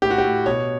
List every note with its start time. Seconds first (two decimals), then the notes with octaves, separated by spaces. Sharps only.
0.02 A2 G4
0.10 F#4
0.18 G4
0.24 A2
0.46 B2 C#5